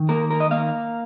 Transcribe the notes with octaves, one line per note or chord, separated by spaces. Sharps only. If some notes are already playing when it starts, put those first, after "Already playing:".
Already playing: D#3
A#3 A#4
A#4
D#5
A#3 F5